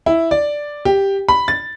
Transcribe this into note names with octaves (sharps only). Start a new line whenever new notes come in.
E4
D5
G4
B5
A6